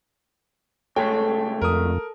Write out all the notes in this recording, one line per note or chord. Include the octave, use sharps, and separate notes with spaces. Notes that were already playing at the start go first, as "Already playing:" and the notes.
C2 G#3 A3 A4 C#5 G5
F2 A#4 D#6